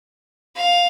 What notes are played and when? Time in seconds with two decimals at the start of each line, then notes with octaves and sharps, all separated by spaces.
0.56 F5